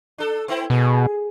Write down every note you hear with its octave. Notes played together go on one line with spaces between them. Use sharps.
D4 A4
B3 C4 E4
B2 G#4